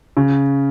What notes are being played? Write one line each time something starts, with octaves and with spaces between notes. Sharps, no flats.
C#3